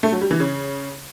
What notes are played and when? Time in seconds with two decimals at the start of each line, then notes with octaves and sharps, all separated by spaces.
0.03 A3
0.12 F#3
0.21 G3
0.31 E3
0.40 C#3